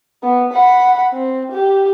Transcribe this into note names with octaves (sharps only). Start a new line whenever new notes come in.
B3
F#5 B5
C4
G4